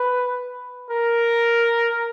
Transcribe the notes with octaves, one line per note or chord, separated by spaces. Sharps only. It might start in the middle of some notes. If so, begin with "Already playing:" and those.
Already playing: B4
A#4